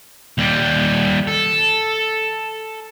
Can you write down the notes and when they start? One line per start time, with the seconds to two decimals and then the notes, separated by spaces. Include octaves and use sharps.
0.38 D#2 G3
1.28 A4